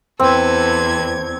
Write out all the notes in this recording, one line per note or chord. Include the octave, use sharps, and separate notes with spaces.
E2 C4 A4 B4 G#6